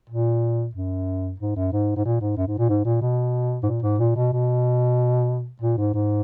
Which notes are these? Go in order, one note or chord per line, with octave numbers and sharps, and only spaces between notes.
A#2
F#2
G#2
F#2
G#2
G#2
A#2
G#2
F#2
G#2
A#2
G#2
A#2
B2
G#2
A#2
G#2
A#2
B2
B2
A#2
G#2
G#2